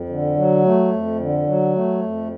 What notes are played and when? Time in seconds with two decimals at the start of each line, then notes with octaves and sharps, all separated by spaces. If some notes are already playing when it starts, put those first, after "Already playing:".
Already playing: F2
0.09 D3
0.37 F#3
0.64 A3
0.92 F2
1.20 D3
1.47 F#3
1.75 A3
2.02 F2